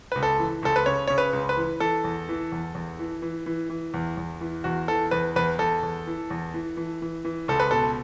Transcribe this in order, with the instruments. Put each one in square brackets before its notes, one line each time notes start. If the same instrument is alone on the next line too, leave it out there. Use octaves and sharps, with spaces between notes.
[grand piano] C#2 B4
A4
E3
C#2 A4
B4
C#3 C#5
C#3 C#5
B4
C#2
B4
E3
E3 A4
E2
E3
E2
E2
E3
E3
E3
E3
E2
E2
E3
E2 F#4
E3 A4
E2 B4
E2 B4
E2 A4
E2
E3
E2
E3
E3
E3
E3
C#2 A4
B4
B2 A4